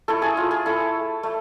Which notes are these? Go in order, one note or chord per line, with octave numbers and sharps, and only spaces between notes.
A3 E4 A4
G#4
F4
G#4
A3 E4 A4
A3